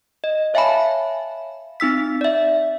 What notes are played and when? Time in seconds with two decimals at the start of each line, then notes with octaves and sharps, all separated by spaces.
0.24 D#5
0.54 C#5 E5 F5 G#5 A5 B5
1.80 C4 D#4 E6 B6
2.21 D5 E5